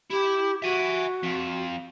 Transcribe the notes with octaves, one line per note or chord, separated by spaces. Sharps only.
E4 G4 B5
F#4 E5 G#5
F2